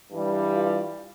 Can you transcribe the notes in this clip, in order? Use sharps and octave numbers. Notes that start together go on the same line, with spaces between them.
G2 E3 G3
F4